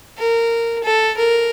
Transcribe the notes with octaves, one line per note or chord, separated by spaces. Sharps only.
A#4
A4
A#4